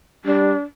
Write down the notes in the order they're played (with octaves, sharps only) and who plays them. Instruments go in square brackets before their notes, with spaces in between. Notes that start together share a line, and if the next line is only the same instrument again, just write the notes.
[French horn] G3 [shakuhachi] D4